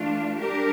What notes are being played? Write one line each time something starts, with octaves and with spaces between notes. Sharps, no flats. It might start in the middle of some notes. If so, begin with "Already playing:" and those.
Already playing: E3 A3 D4 F4
G3 D4 G4 A#4